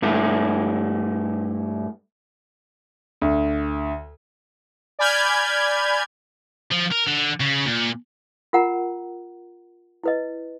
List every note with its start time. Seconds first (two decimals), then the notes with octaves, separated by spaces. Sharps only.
0.02 G2 A3 E4
3.21 D2
4.99 D5 G#5 B5 F6 G6 G#6
6.71 F3
6.91 A#4
7.07 D3
7.40 C#3
7.66 A#2
8.53 F4 A#4 F#5 A#5
10.03 E4 B4 D#5